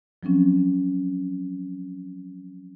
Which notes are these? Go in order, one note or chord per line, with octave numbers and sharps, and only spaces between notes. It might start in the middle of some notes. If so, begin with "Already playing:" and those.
F3 F#3 C4 C#4